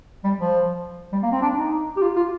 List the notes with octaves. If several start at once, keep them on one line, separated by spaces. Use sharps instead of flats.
G3
F3
G3
A#3
C4
D4
D#4
G4
F4
F4